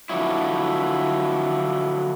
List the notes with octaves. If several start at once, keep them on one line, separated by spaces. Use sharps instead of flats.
D3 F3 F#3 E4